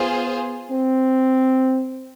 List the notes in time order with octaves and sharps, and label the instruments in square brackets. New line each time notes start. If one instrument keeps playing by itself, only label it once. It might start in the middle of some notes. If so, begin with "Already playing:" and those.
Already playing: [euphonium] B3 [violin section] F4 G#4 C5
[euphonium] C4